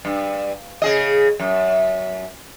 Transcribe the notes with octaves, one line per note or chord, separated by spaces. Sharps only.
G2
C#3 G#4 D#5
F#2